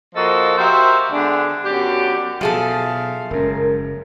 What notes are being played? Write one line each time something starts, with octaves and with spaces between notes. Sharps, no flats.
F3 A#3 F#4 A4 D#5
F#4 G4 A#4 C5 E5 F5
D3 G#3 B3 D4
F#2 B3 D4 G4
B2 F3 F#3 G#4 A4 E5 F5
F#1 F#2 G#3 C#4 A#4